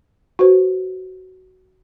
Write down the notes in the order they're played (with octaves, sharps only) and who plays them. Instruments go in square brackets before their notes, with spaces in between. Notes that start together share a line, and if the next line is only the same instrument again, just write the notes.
[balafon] F#4 B4 C5